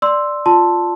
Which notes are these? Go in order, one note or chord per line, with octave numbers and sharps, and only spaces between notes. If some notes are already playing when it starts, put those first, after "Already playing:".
D5 C6 E6
F4 A5 C6